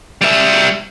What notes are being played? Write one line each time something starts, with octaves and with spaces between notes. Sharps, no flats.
G3 E5